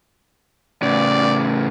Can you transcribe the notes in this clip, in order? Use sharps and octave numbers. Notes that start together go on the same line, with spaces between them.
A2 C#3 D5